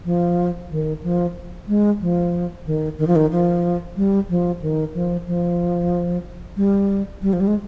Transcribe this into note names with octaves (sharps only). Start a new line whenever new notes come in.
F3
D#3
F3
G#3
F3
D#3
D#3
F3
D#3
F3
G3
F3
D#3
F3
F3
G3
G3
F3
G3
G#3